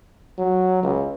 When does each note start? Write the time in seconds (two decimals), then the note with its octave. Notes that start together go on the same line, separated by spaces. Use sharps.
0.39 F#3
0.83 C#2